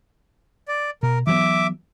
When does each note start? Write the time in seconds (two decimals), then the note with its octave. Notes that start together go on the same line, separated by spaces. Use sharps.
0.68 D5
1.03 B2 A#4
1.27 E3 F#3 B3 E5 D6